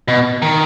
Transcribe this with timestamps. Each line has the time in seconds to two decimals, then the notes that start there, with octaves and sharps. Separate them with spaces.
0.08 B2
0.42 D#3